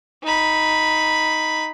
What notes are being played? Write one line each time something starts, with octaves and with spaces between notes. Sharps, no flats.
D#4 B5